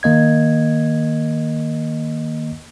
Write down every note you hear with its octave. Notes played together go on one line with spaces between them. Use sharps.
D#3 A#3 D#5 G#6